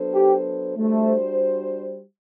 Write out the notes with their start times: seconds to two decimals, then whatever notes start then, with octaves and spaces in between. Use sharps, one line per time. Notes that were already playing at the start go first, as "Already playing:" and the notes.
Already playing: F#3 B3 D4 A4 C5
0.14 G4
0.77 G3 A3 D4 F#4 C5